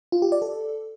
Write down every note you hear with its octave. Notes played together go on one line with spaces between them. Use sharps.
F4
G4
D5
A4